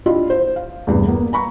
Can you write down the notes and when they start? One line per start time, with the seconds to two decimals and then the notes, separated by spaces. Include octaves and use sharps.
0.06 D4 E4 F4 G4 D#5
0.30 C5
0.56 F5
0.87 E2 G2 C3
1.07 A#3 B3
1.33 A#5 B5 C#6